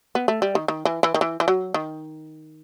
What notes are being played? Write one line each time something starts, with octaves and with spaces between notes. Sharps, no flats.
B3
A3
G3
D#3
D#3
E3
E3
D#3
E3
E3
F#3
D#3